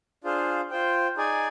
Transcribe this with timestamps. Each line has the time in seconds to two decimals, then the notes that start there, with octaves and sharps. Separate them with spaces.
0.24 D4 F4 G#4 C5 F5
0.71 F4 C5 G5
1.16 D#4 G#4 D5 G#5